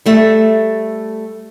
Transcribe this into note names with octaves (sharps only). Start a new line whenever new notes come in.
G3 A3 E5